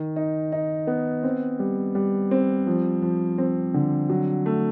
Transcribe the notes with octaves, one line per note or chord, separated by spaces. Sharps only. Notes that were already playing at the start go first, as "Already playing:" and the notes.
Already playing: D#3
D#4
D#4
B3
C4
G3
G3
C4
F3
F3
C4
D3
F#3
A3